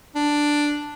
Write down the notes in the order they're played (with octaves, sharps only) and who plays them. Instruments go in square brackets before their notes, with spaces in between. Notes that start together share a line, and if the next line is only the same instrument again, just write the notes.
[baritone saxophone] D4